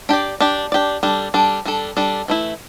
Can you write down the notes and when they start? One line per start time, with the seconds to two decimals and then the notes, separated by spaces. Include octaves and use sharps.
0.09 D4 G4 D5
0.40 D4 G4 D5
0.72 D4 G4 D5
1.03 G3 D4 A4
1.34 G3 D4 A4
1.65 G3 D4 A4
1.97 G3 D4 A4
2.28 E3 A3 E4